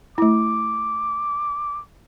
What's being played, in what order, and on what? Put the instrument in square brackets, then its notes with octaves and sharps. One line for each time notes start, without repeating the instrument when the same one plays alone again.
[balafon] A3 E4 [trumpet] D6